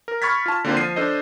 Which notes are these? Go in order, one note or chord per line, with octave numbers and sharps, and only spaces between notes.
A#4
B5 C#6 F6 G#6 A6 B6
F4 A5
D3 A#3 C4 F4 C5
F3 C7 D#7
D4 A4 C5 D#5